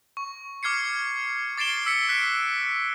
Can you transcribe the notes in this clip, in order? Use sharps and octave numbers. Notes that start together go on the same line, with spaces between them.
C#6
D6 F6 G#6 C7 C#7
D6 A6 C7 D7 E7 G7
E6 B6 C#7
F#6 B6 D7